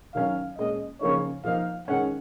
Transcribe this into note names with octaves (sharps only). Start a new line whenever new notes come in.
D#3 F#3 C#4 F5
A#2 G#3 C#4 D#5
C#3 F3 A#3 D#4 C#5
F3 A#3 D#4 F5
D#3 G#3 C#4 F#5